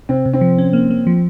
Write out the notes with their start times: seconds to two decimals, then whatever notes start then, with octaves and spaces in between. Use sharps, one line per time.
0.09 C3 C4
0.26 C3
0.33 C4
0.41 F3
0.58 C#4
0.73 A#3
0.90 A#3
1.07 F3